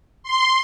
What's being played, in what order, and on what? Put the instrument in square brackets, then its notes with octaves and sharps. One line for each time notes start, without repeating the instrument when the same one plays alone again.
[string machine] C6